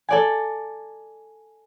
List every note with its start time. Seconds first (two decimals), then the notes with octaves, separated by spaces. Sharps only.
0.09 A4 D5 G#5